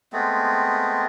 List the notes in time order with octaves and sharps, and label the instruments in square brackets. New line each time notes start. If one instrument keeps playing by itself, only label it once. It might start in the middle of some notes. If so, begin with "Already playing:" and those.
[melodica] G#3 A3 B3 C4